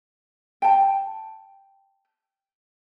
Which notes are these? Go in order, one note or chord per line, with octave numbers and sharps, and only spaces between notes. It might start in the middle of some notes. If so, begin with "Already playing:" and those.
G5 A5